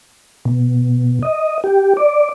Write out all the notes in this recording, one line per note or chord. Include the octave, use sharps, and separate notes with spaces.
B2
D#5
G4
D5